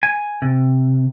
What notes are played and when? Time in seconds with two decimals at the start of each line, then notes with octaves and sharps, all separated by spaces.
0.03 G#5
0.42 C3